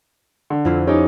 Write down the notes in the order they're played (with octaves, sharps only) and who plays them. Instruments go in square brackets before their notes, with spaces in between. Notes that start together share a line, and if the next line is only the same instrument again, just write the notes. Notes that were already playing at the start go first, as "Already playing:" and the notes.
[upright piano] D3
[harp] F2 E4 F4
[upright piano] C#4 D#4 [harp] G4